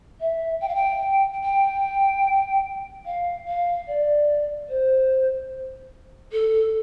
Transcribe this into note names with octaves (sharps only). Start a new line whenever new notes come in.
E5
G5
F5
G5
G5
F5
F5
D5
C5
A4